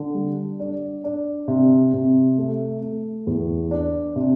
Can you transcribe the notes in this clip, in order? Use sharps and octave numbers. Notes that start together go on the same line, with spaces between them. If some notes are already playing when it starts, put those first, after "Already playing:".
Already playing: D3
G3
D4
D4
C3
C3
A3
A3
E2
D4
C3